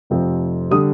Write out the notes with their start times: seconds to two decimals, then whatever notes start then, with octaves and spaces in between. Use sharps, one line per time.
0.10 F1 F2 C3 F3 C4
0.71 D3 G3 D#6